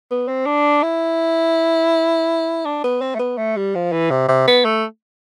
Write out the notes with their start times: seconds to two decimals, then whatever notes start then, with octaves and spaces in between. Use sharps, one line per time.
0.11 B3
0.28 C4
0.46 D4
0.83 E4
2.65 D4
2.84 B3
3.01 C4
3.15 A3
3.19 B3
3.38 A3
3.57 G3
3.75 F3
3.92 E3
4.10 C3
4.28 C3
4.48 B3
4.65 A3